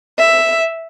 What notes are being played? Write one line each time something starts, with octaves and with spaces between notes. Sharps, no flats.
E5